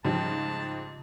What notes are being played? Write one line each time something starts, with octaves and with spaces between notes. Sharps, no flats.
G#2 C#3 F3 G3 A5